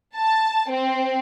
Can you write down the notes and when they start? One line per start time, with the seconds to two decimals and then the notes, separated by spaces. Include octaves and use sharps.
0.16 A5
0.71 C4